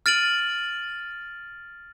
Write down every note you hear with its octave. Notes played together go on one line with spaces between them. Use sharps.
F6 A6 D7 D#7 F#7